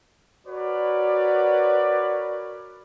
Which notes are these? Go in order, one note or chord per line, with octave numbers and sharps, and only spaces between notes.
F#4 A#4 B4 C#5 D5